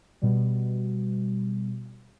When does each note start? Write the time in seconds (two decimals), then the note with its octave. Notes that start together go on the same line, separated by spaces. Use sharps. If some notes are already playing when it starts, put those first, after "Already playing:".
0.22 B2 G3